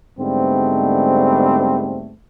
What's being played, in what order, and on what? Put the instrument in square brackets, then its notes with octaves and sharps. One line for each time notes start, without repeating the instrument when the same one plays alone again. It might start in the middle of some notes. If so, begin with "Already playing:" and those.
[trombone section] G#2 D3 G3 A3 B3 C4